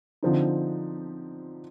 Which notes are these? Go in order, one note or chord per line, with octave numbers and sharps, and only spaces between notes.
D3 F3 C4 D#4